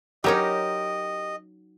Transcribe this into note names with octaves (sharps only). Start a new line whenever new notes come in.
F#3 C#4 D#4 G4 A#4 D#5